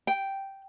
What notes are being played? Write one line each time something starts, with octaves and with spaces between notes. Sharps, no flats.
G5